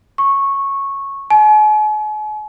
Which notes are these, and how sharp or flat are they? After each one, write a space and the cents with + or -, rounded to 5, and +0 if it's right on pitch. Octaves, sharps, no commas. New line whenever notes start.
C#6 -10
G#5 +45